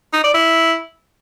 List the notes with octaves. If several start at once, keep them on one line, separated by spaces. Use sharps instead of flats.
D#4
D5
E4